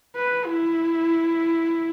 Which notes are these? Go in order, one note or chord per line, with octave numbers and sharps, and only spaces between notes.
B4
E4